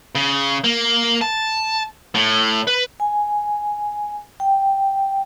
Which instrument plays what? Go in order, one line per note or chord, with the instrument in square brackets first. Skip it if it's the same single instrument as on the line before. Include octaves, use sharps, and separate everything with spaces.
[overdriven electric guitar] C#3
A#3
A5
A2
B4
[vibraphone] G#5
G5